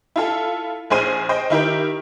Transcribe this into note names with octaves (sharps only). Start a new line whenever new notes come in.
E4 F4 A4
A#1 G#4 C5 D#7
C5 D#5 G5
D#3 E4 G4 A#4